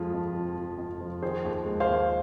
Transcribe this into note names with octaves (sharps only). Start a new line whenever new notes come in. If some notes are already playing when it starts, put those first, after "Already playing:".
Already playing: F2 F3 G#3 F4
F2
F3
F3
F2
F3
D#3 G#4 C5
D#2
G#3
C5 F5
D#2